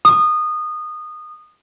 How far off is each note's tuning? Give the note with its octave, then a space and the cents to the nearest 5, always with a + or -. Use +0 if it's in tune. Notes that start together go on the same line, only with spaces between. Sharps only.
D#6 -20